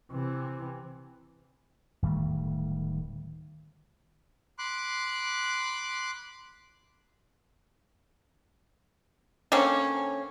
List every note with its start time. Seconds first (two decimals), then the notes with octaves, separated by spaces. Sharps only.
0.11 C3 E3
2.02 D1 D#3 G3 A3
4.59 B5 C6 D6 F#6
9.52 D3 A#3 C4 C#4